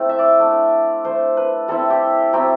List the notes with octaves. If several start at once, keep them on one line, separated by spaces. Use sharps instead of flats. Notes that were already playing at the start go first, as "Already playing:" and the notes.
Already playing: A3 C4 E4
E5
D5
A3 D4
A3 D4 C5
B4
G3 C4 E4 A4
G4
F#3 C4 E4 G4